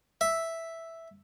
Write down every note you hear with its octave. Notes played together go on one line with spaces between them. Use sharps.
E5